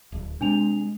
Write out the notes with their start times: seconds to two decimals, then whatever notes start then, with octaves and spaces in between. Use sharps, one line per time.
0.12 D1
0.41 C3 G#3 D4 G#5 F7